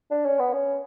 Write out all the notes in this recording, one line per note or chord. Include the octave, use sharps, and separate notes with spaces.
D4
C#4
B3
C#4